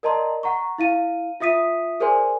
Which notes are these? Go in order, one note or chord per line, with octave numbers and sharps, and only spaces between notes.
A#4 D5 D#5 A5 A#5 C6
F#5 A#5 C#6
E4 F5 D#7
F4 E5 D#6 B6 D#7
G#4 A#4 C5 D5 G#5 C6